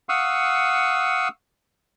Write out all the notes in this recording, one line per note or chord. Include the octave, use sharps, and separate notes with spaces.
F5 F#5 C#6 D#6 E6